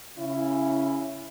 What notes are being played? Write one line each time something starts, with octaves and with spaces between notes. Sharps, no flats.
C#3 C#4 E4